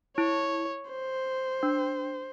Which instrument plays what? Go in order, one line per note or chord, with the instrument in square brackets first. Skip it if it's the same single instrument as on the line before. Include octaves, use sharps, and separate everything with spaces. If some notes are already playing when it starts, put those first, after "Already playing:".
[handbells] E4 [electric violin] C#5
[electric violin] C5
[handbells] D4